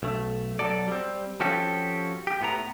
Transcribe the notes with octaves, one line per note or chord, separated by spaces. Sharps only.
B1 A3
B1 E2 F#3 A4 D5
G3 C4
F3 C4 C#4 F#4 G4 A4
G4
A2 B3 A#5